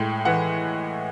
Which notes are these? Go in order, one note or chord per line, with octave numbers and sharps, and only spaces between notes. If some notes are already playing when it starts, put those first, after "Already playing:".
Already playing: A2 G#3 G5
E3 F#5